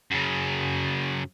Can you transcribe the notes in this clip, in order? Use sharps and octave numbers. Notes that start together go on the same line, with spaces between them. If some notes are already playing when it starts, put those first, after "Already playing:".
F#2 C#3